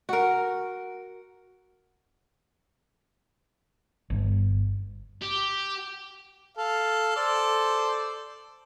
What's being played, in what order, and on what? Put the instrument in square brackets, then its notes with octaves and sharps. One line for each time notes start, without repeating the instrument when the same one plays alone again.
[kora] F#4 A#4
[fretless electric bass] G1
[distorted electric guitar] G4
[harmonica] A4 F5
A4 C5 D5